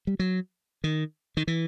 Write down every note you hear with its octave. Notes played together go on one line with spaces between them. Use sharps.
G3
F#3
D#3
D#3
E3